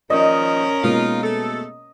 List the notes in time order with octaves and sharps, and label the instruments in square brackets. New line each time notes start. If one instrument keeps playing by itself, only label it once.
[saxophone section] A#2 D#3 F3 [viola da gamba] C#4 A#4 [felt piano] D5 [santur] D#5
[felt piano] B2 G#3 A#3 [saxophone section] D#4 F4
[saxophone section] A3 A4